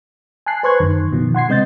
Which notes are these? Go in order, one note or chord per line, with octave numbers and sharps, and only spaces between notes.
G#5 A5 F#6 C7
B4 C5 C6 C#6 F#6 G#6
F#2 D#3
B2 D#3 F3
F#5 C6 G#6 C7
C3 G#3 C4 D#5 G6 A6